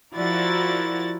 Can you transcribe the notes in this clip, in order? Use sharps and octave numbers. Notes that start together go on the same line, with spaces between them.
F3 E4 F#4 A#4 D5 A6